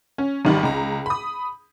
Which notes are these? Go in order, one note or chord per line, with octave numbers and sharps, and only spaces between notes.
C#4
G#1 D#3 G3
C#2 A#5
B5 D#6